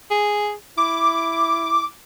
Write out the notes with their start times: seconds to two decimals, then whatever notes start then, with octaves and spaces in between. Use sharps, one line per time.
0.11 G#4
0.77 E4 D6